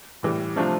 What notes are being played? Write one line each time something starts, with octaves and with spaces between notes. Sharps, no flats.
A2 E3 G3
C3 F3 A3 D4 F4